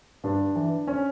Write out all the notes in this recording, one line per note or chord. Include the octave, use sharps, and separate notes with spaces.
G2 D4
E3
C#4